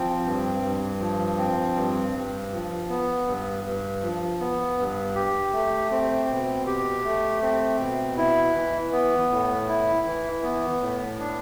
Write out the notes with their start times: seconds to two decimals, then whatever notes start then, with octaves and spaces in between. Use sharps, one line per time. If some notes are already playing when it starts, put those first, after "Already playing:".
Already playing: F3 C4
0.25 G2
0.62 G2
1.00 F3
1.38 C4
1.76 G2
2.13 G2
2.52 F3
2.89 B3
3.27 G2
3.64 G2
4.02 F3
4.40 B3
4.78 G2
5.15 G4
5.53 A3
5.91 C4
6.29 B2
6.67 G4
7.04 A3
7.42 C4
7.80 B2
8.17 E4
8.55 E3
8.92 B3
9.31 A2
9.69 E4
10.06 E3
10.43 B3
10.81 A2
11.19 D4